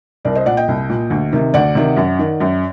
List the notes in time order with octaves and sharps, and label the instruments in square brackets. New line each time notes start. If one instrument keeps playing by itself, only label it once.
[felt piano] C2 A#4 D5
C5 D#5
A#2 D5 F#5
D#5 G5
C2
A#2
D2
C3 D#3
D2 D5 F#5
C3 D#3
F#2
D#3
F#2